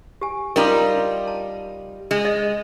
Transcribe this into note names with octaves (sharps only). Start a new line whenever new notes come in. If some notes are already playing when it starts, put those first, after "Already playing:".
G4 G#5
G3 D#4 F4 A#4 D6
A5
G#3
D#5